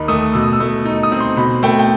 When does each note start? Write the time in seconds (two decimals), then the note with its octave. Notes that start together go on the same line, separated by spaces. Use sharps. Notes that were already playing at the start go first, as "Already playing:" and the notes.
Already playing: D#2 D#3 D#4 B5
0.08 A3 D#6
0.34 B2 E6
0.43 D#6
0.53 E6
0.60 A3
0.85 D#4
1.03 D#6
1.12 C4
1.21 C6
1.37 B2 B5
1.63 A3 G5
1.79 G5